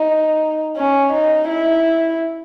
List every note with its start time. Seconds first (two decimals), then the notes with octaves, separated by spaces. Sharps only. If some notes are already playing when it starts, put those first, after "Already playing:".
Already playing: D#4
0.77 C#4
1.13 D#4
1.49 E4